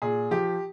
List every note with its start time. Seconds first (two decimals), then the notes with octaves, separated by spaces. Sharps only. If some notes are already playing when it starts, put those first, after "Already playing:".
0.02 A#2 G#4
0.31 F3 G4